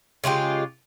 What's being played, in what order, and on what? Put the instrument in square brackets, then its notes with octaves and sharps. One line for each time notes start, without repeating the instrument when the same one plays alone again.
[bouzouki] C#3 G#3 F4 G4